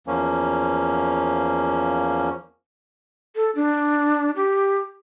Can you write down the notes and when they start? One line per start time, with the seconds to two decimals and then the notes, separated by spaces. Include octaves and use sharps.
0.07 E2 F3 A#3 C#4
3.36 A4
3.55 D4
4.36 G4